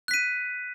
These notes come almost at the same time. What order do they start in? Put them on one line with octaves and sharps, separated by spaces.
F#6 B6 D#7